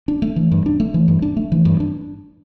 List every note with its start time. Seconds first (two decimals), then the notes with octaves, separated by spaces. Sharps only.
0.08 D4
0.22 A3
0.36 E3
0.52 G2
0.66 D4
0.80 A3
0.94 E3
1.08 G2
1.22 D4
1.37 A3
1.52 E3
1.65 G2
1.80 D4